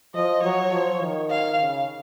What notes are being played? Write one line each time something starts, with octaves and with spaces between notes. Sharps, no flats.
F3 D#5
F#3 C#5
F3
D#3
F5
C#3